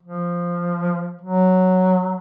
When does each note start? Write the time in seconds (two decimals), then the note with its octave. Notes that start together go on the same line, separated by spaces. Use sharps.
0.03 F3
1.21 F#3